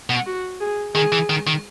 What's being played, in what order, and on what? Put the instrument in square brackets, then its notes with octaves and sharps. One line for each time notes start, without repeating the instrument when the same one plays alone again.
[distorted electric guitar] B2
[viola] F#4
G#4
[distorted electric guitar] D#3 [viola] G#4
[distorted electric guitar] E3
D#3
D#3